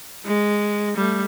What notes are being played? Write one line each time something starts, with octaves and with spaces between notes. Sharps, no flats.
G#3
G3 A3